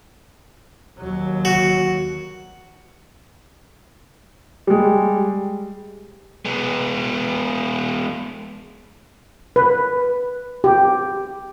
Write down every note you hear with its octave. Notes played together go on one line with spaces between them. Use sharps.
D#2 F#3
F#4
G3 G#3
G#3 B3
B4
G4